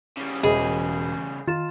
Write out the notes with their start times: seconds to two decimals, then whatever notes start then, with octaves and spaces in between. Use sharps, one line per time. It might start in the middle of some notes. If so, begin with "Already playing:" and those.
0.17 C#3 G3
0.43 E1 E3 G#4 D#5 B5
1.47 D#3 F4 A6 E7